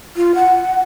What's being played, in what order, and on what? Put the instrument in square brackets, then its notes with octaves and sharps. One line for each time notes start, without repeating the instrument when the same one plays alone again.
[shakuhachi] F4
F#5